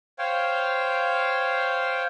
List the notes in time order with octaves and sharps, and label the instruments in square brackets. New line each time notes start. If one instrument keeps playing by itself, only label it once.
[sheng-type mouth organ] C5 C#5 F5 G5